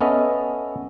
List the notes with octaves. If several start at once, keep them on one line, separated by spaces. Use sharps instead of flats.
B3 C#4 A4 D#5 E5